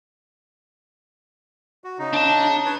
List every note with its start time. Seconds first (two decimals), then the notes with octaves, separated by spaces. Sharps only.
1.84 F#4
1.99 C#3 D#4
2.14 D4 A5
2.65 B4 C#5 A5